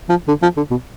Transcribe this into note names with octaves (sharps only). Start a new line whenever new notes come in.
F3
D3
F3
D3
B2